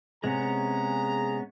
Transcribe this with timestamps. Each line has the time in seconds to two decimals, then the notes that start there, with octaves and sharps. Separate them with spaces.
0.24 C3 G#3 B3 C#4 G#4 A#5